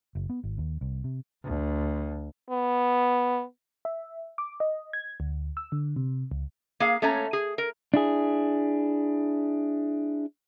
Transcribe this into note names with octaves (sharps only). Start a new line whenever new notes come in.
F#1
B3
G#1
D#2
C2
C3
D2
B3
E5
D6
D#5
G#6
D2
E6
D3
C3
C#2
A#3 G#4 F5
A3 A#3 C#4 C#5 A#5
G#4
A#4
D4 E4 G#4